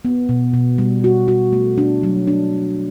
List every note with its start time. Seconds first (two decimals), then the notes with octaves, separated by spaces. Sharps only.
0.05 B3
0.29 B2
0.54 B2
0.78 G3
1.04 F#4
1.28 F#4
1.53 A3
1.78 D4
2.03 F#3
2.27 D4